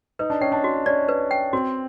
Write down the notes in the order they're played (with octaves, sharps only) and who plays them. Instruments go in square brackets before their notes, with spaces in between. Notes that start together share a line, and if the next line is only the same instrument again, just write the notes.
[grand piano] D#4 [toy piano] B4
[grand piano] D4
[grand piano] C#4 [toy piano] G5
[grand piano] D4
[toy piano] F#4
[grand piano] C#4 [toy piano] D5
[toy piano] B4
G5
[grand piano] C4 [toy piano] F#4